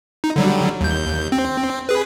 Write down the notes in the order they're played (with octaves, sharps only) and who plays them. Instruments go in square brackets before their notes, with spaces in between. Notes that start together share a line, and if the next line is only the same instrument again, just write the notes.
[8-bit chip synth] D#4
D3 F#3 G3
D#2 G6
C4
G#4 B4